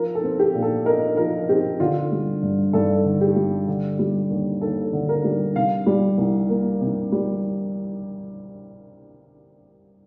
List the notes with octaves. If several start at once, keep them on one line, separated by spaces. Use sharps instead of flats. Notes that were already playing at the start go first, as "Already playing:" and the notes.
Already playing: F3 A#4
A4
C4
G4
A#2
A4
D#4 A#4
F3 A#4
C4 G4
D3 F4
G3
G2
G2 A4
D3
G4
G3
D3
G3
D#2
D#2 A4
D3
A#4
G3
C3 F5
G3
C2
A#3
C3
G3